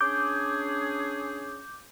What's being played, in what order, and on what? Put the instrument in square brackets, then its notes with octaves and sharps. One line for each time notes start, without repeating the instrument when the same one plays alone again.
[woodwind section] C#4 D4 G#4 [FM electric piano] D6 G6